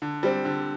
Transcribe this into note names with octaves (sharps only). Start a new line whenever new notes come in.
D3
G3 C4
D3